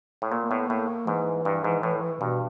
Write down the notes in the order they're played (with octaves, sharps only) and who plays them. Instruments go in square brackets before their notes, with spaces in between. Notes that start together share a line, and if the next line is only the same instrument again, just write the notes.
[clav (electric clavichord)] A2
[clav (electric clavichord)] A#2 [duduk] A#3
[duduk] A#3
[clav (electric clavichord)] A2 [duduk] B3
[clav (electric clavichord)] A2 [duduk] A#3
[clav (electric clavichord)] G#2 [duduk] E3
[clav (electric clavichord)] G2
G#2
A2
[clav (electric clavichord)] G2 [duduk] B2